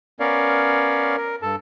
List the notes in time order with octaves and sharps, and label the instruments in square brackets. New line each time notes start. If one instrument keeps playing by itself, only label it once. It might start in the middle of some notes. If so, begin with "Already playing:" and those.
[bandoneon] B3 C#4 A#4 C#5 D5 F5
A#4
G2 A4 A5